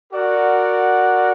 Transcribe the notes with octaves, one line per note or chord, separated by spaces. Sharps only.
F#4 A#4 D5 F#5